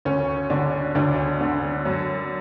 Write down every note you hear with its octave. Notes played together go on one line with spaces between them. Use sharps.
D2 C#4
D3 D4
D2 D4
D3
F#2